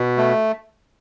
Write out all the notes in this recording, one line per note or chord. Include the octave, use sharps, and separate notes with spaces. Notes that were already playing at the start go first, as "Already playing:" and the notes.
Already playing: B2
A3